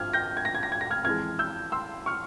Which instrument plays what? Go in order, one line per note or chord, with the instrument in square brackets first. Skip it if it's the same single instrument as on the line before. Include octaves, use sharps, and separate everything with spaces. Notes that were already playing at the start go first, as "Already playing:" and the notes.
Already playing: [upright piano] G#1 G2 F3 C4 F6 G#6
G6 A#6
G#6
A#6
G#6
A#6
G#6
A#6
F6 G#6
F2 E3 G#3 F6 G#6
E6 G6
C6 E6
C#6 F6